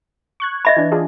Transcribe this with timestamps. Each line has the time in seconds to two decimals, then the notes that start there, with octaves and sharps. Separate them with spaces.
0.40 C#6 F#6 G#6
0.65 D#5 E5 B5 G#6
0.77 E3 D4
0.92 D4 F4 G#4